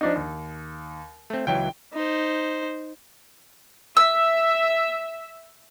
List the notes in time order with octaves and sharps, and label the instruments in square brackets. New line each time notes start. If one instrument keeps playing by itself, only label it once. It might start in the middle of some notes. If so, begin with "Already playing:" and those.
[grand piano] F3 D4 D#4
D#2
[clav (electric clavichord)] A3 C4
[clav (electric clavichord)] C#2 E3 F#3 [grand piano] G5
[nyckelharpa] D#4 C5
[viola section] E5 [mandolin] E6